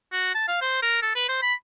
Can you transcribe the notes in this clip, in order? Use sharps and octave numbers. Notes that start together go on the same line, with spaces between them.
F#4
A5
F5
C5
A#4
A4
B4
C5
B5